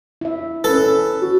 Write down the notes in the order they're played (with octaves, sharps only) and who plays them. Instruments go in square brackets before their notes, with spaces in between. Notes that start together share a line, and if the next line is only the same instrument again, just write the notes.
[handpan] E4 E5
[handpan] C#4 B4 [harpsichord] A4
[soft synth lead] F#4